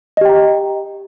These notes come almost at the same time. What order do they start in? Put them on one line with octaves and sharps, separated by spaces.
D#5 G4 G5 A#5